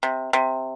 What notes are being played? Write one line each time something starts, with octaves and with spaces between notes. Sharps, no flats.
C3
C3